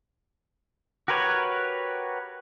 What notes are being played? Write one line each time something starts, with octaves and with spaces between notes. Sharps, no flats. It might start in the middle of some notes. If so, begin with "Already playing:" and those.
F#4 G4 A#4 B4 C#5